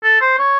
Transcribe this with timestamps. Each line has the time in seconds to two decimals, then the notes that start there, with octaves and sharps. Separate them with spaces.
0.03 A4
0.21 C5
0.39 C#5